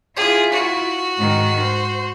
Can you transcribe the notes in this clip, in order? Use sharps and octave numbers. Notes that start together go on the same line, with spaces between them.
E4 F4 G#4
F#4
G#2 D#3
C5